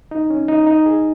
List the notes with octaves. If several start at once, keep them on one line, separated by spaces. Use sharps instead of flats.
D#4
C#4
D#4
D#4
G#4